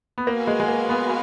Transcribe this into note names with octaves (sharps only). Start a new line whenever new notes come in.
B3
A#3 F#4 B4 F5 G#5
G#3
G#3
A#3
B3